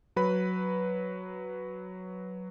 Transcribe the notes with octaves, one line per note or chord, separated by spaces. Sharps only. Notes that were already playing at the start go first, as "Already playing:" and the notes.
F#3 B4 B5